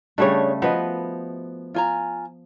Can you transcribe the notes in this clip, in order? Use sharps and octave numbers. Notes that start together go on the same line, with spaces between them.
C#3 G3 A3 D4 G#4 C#5
F3 B3 F#4 B4 D#5
F4 G#5 A#5